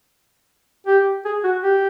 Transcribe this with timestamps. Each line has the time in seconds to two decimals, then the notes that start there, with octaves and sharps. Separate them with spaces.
0.87 G4
1.25 G#4
1.44 F#4
1.63 G4